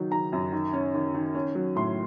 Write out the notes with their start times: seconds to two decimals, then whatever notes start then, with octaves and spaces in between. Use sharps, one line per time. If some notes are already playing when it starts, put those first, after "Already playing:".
Already playing: D#3 F#3 D#4
0.11 D#3 A#5
0.32 F#2
0.52 D#3
0.73 C#4
0.94 D#3
1.14 D#3
1.35 C#4
1.55 F#3
1.75 A2 C6